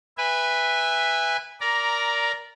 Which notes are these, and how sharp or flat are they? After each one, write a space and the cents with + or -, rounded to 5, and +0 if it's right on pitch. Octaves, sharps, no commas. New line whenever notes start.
B4 +0 E5 +0 G#5 -25
A#4 +0 D5 -10 A#5 +10